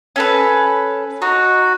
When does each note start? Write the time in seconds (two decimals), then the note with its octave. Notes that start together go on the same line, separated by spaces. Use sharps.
0.16 C#4 A4 B4
1.22 D#4 F#4